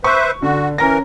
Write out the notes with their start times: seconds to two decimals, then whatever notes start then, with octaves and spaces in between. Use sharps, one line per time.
0.04 B4 C5 E5 C#6
0.42 D3 F#4
0.78 E3 C#4 A#4 A#5 A#6